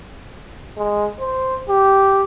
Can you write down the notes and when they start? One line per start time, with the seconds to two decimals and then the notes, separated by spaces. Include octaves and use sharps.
0.77 G#3
1.20 C5
1.69 G4